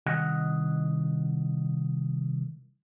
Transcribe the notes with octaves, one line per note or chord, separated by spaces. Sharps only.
C2 D#3 D#5 F#5